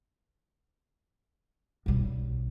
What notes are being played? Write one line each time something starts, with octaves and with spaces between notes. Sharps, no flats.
B1 G3